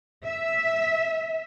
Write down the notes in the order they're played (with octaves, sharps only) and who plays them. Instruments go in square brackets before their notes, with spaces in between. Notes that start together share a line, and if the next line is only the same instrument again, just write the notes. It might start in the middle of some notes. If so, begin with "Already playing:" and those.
[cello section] E5